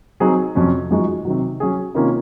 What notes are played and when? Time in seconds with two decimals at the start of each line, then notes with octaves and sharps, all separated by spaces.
0.20 F#3 C4 D#4 G#4
0.55 F2 C3 F#3 C#4
0.90 F#2 F3 G#3 D#4 F#4
1.25 C3 D#3 F#3
1.60 F#3 C#4 G#4
1.94 C3 D#3 A#3 C#4 F4